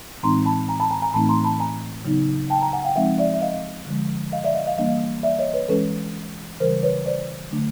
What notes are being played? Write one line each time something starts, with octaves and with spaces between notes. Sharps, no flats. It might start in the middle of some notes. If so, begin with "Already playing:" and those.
A2 E3 G#3 C4 D#4 A#5 C6
A5 B5
G#5 A#5
A5 B5
G#5 A#5
G#5 A#5
A2 E3 A3 C4 D#4 A5 B5
A#5 C6
A5 B5
G#5 A#5
C#3 F#3 B3 D#4
G5 A5
G#5 A#5
F#5 G#5
F5 G5
F3 G#3 C4 D#4 E5 F#5
D5 E5
E5
D#5 F5
D3 F3 G#3
D#5 F5
D5 E5
D#5 F5
D#5 F5
E3 G3 A#3 D4 D#5 F5
D5 E5
C#5 D#5
B4 C#5
E3 G#3 C#4 A4 B4
C#3 E3 G3 A#4 C5
B4 C#5
C5 D5
D3 F#3 A3 D4